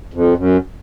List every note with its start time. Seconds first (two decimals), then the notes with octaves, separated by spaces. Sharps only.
0.14 F2
0.37 F#2